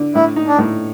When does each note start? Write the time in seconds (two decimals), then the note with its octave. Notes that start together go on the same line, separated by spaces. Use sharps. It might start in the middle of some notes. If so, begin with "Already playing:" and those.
Already playing: D3
0.15 A2 E4
0.36 D#4
0.48 D4
0.59 A2